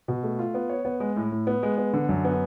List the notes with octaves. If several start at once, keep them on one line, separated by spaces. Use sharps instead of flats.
B2
A3
F4
B3
C#5
B3
G#3
A2
A2
B3
G#3
B3
D3
F#2
B3